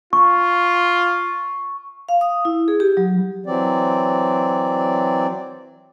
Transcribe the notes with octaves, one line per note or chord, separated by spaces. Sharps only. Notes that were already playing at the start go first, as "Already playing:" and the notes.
F4 C#6
F5
D#6
E4
G#4
G4
F#3
E3 F#3 C4 D5